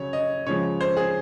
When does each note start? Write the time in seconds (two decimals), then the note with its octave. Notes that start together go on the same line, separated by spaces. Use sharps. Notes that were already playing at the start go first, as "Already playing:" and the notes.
Already playing: C#3 F#3 C#5
0.13 D#5
0.46 C#3 F3 G#3 C#5
0.81 C5
0.97 G#4